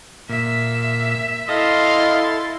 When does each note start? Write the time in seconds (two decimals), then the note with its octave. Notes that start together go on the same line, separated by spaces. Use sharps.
0.29 A#2 E5
1.49 E4 A4 D#5 F5 C6 A6